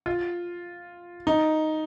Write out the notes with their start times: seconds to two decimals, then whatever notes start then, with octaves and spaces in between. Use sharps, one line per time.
0.06 F4
1.27 D#4